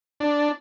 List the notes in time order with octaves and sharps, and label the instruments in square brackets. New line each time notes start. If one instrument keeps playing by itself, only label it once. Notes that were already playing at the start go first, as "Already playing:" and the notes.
[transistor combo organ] D4